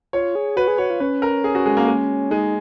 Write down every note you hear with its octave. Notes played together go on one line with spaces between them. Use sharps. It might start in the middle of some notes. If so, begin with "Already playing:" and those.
F4 C#5
G#4
F#4 B4
G#4
F#4 C#5
F4
C#4 B4
A#4
G#4
F#4
G#3
A#3
G#3
G#3 D#4